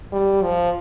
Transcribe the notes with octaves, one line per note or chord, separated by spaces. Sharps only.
G3
F3